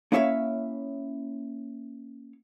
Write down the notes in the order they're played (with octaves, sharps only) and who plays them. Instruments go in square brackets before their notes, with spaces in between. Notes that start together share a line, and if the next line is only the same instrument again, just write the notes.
[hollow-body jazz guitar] A#3 C#4 E4 C#5 E5 F5